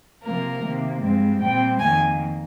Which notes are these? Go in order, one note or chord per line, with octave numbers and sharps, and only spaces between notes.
C3 F3 A#3 A#4
C3 D#3 A#3
G2 F3 G#3 C4
A#2 G3 C4 G5
F2 D#3 A#3 G#5